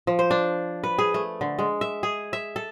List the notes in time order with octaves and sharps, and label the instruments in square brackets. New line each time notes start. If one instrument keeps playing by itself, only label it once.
[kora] F3
C5
D4
B4
G#4
A3
D3
G#3
E5
G#4
E5
A4